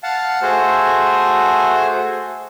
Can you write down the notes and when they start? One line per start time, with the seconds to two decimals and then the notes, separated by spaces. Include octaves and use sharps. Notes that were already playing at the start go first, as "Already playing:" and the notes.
0.03 F5 F#5 A5
0.42 A3 F#4 G#4 C5